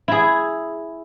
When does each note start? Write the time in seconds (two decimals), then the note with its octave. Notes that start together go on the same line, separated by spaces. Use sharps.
0.08 E4 G#4